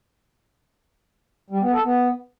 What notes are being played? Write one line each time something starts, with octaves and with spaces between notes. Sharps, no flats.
G3
B3
A4
B3